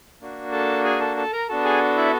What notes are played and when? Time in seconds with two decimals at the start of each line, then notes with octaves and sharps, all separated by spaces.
0.21 A#3 D4 F#4
0.52 A4 A5
0.84 G#4 G#5
1.00 A4 A5
1.17 A4 A5
1.32 A#4 A#5
1.48 B3 D4 F#4 A4 A5
1.65 G#4 G#5
1.97 E4 E5